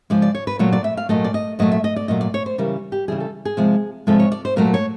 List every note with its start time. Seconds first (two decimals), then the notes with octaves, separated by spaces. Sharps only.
0.10 C#3 F3 G#3 D5
0.22 D5
0.35 C#5
0.47 B4
0.59 A#2 F#3 A3 C#5
0.72 D5
0.84 E5
0.97 F5
1.09 A#2 F#3 A3 D#5
1.24 D5
1.34 D#5
1.59 A#2 F#3 A3 D#5
1.72 E5
1.84 D#5
1.96 D5
2.08 A#2 F#3 A3 D#5
2.21 D5
2.34 C#5
2.46 C5
2.58 C#3 E3 G3 A#4
2.92 G4
3.08 C#3 E3 G3 G#4
3.20 A4
3.45 G#4
3.57 C3 F3 G#3
4.07 C3 F3 G#3 A4
4.19 C#5
4.32 D5
4.45 C5
4.56 A#2 F#3 A3 A#4
4.74 C#5